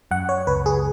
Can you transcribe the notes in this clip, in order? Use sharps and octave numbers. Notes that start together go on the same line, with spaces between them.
F#2 F#5
C#5
C#2 B4
G#4